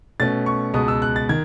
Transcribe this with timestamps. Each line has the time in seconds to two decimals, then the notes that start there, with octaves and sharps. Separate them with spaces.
0.20 B2 A3 C#4 A6
0.46 C#6
0.74 C#2 B2 G#3 B3 D#6
0.88 E6
1.02 F#6
1.16 A6
1.29 D#3 G#6